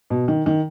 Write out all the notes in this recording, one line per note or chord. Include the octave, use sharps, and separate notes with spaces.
B2
D#3
D#3